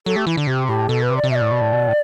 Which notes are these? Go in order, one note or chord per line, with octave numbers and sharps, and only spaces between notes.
F#3 A4
A3 G4
E3 E4
D3
C3 G4
A2 G4
B2 A4
B4
C3
D5
C3
B2 E5
D5
A2
B2
A2
B2
A2